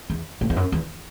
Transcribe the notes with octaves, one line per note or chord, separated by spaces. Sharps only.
E2
A2
E2
F#2
E2